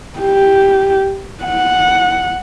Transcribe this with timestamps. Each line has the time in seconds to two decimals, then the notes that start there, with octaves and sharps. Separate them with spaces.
0.19 G4
1.44 F#5